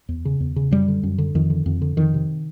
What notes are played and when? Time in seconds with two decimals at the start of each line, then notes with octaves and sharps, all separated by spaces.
0.09 E2
0.25 C#3
0.40 E2
0.56 C#3
0.71 F#2 G3
0.88 D3
1.03 F#2
1.18 D3
1.35 F2 D#3
1.50 D3
1.66 F2
1.82 D3
1.97 F2 D#3
2.14 C3